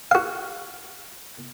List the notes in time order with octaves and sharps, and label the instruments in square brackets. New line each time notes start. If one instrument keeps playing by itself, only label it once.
[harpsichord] F#4 F5